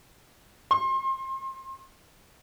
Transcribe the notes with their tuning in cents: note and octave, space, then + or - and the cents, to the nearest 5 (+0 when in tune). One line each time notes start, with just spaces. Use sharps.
C6 +30